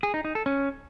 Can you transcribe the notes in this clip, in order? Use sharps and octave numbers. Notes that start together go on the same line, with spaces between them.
G#4
D#4
D#4
A4
C#4